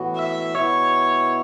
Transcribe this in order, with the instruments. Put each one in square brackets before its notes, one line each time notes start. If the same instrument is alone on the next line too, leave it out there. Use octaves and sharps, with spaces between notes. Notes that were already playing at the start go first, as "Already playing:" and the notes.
Already playing: [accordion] A2 E3 B3 F#4
[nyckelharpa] E5
[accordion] B2 B3 E4 [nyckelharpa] C#5